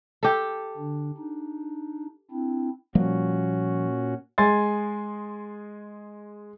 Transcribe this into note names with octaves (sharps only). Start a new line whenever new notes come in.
G4 A4
D3 D4
D4 D#4
C4 D4 E4
A#2 F3 G3 A#3 C#4 F#4
G#3 G#5 C6 A6